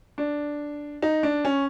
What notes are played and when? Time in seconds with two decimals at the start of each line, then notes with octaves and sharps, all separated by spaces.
0.18 D4
1.02 D#4
1.23 D4
1.45 C#4